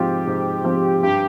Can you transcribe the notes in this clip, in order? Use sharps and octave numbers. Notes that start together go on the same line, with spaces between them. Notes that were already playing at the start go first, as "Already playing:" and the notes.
Already playing: G#2 F3 C4 F4 G4
G#2
F3 C4 F4
G2 G4